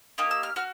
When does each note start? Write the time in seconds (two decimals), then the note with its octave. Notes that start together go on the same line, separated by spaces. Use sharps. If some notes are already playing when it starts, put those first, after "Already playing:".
0.18 A#3 D#4 G4 D#6
0.31 E6
0.43 F6
0.56 F#4 F6